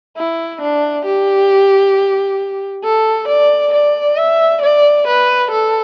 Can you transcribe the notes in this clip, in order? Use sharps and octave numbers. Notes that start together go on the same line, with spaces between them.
E4
D4
G4
A4
D5
D5
E5
D5
B4
A4